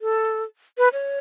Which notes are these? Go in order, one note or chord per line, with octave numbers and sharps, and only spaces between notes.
A4
B4
C#5